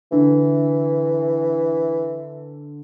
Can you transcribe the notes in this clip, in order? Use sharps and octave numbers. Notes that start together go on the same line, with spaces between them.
D3 E3